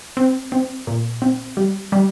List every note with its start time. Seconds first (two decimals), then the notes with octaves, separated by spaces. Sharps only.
0.17 C4
0.52 C4
0.87 A#2
1.22 C4
1.57 G3
1.92 G3